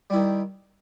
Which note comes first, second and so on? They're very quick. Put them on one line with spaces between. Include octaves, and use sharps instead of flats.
G3 E4 D#3